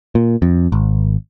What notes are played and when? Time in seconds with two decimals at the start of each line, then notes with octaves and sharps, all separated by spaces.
0.15 A#2
0.42 F2
0.72 G#1